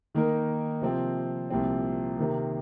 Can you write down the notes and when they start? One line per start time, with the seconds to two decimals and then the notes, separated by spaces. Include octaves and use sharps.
0.15 D#3 A#3 D#4 A#4
0.82 C3 F3 C4
1.50 C2 A#2 F3 C4
2.18 C3 D#3 A#3